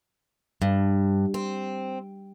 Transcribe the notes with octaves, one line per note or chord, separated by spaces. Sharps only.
G2
C4